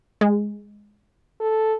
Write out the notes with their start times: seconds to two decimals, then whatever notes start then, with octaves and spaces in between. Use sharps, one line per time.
0.21 G#3
1.40 A4